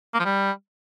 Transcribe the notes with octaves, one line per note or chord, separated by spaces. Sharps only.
A#3
F3
G3